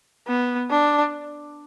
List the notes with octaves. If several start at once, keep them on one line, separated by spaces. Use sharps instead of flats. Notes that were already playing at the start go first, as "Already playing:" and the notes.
B3
D4